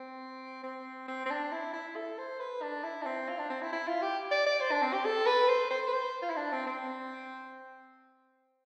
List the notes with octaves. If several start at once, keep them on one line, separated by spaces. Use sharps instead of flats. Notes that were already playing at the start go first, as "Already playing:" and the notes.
Already playing: C4
C4
C4
C4
D4
E4
E4
A4
C5
B4
D4
E4
D4
C4
F4
D4
C4
E4
E4
F4
G4
D5
D5
C5
D4
C4
G4
A4
B4
C5
C5
B4
C5
F4
E4
D4
C4
C4